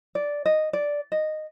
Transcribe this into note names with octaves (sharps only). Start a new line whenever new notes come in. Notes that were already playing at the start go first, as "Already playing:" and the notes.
D5
D#5
D5
D#5